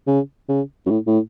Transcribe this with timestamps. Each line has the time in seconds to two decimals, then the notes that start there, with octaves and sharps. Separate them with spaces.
0.07 C#3
0.49 C#3
0.86 F#2
0.90 A2
1.07 A2